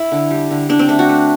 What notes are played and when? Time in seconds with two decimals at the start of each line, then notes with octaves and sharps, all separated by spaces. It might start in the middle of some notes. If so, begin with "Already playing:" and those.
Already playing: E4
0.12 D3
0.31 G3
0.51 D3
0.69 D3 D4
0.79 C4
0.89 A3 D4
0.99 F#4
1.09 A3